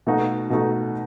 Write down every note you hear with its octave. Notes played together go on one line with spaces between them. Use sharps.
B2 A3 D#4 F#4
B2 A3 D#4 F#4